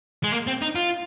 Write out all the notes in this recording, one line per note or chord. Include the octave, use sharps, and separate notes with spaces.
G#3
A#3
C4
D#4
F4